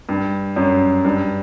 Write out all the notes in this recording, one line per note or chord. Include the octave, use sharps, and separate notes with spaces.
G2
F#2
G2